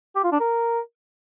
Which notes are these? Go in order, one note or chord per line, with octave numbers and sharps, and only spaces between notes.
G4
F4
D4
A#4